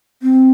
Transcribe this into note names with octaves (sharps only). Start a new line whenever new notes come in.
C4